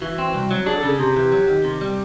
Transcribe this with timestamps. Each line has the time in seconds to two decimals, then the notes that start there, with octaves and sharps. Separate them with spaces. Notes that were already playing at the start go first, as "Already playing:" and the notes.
0.02 E3 F#4
0.18 C4
0.35 C2
0.51 F#3
0.66 D4 G#4
0.78 A4
0.83 C#3
0.88 G#4
1.00 C3 G4
1.16 E3
1.32 F#3
1.48 D#3
1.64 C3
1.81 G3